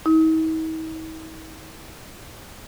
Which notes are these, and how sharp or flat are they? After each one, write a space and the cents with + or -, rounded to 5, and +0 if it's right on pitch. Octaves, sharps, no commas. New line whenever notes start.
D#4 +45